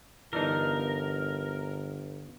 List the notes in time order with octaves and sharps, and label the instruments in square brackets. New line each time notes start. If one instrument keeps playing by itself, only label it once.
[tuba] G1 [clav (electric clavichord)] E3 D4 D#4 [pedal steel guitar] A#4